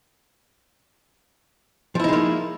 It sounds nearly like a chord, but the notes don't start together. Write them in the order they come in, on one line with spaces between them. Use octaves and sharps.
F3 E4 D#4 G#3 A#3